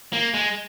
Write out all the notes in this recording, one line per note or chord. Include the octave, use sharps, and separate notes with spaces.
A#3
G#3